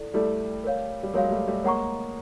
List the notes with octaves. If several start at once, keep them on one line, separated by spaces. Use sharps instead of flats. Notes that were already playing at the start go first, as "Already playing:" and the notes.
Already playing: E4 A4 D5
G3 A3 E4 A4 D5
A#4 C#5 F5
G3
F#3 G#3 A#4 C#5 F5
G#3
G3 A3
G3 A3
G#3 A#3 C#5 F#5 A#5 C#6